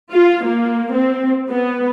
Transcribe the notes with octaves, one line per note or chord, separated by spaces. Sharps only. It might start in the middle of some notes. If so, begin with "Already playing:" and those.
F4
A#3
C4
B3